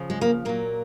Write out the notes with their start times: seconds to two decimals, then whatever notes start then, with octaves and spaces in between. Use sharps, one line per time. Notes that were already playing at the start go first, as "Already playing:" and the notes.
Already playing: C#3 F3
0.10 G#3
0.21 A#3
0.45 A#2 F#3 A#3